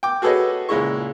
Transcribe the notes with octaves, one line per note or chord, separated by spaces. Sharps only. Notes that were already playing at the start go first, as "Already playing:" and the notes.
G5 D6
F#4 G#4 A4 B4 C#5 D#5
C#2 A#2 G#3 E4 C#6